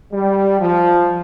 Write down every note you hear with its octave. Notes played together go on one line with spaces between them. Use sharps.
G3
F3